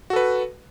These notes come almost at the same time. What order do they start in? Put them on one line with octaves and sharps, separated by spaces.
F#4 A4 B4